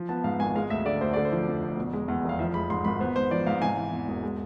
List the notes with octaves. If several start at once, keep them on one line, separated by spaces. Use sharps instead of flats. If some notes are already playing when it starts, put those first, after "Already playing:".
Already playing: F3
B3 A5
G#2 F5
G#1 G#5
G#3 F5
D2 E5
D3 D5
D2 C5
D3 D5
C5
F3
F2
F1
B2
G#3
E2
F1 F5
F3 E5
G#3 B5
G#2 C6
G#1 B5
B3 C5
G#2 C5
F3 D5
G#2 F5
C3 G#5
E3
E2
E1
G#3